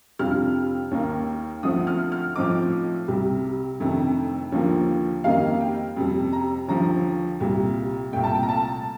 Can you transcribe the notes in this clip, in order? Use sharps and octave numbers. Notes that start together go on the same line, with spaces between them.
F2 C3 G3 D4 F4 F6
D#2 D#3 A#3
D2 D3 F3 A3 C4 D#6
F6
F6
A2 F3 C4 D#4 D6
C2 C3 G3
F2 C3 D#3 A3 D4
D#2 D3 F3 A#3
F2 D#3 G3 A#3 D#4 F5
G5
F2 C3 G3
A#5
D#2 D3 F3 A#5
C2 A#2 G3
C2 A#2 A3 G5
A5
G5
A#5
A5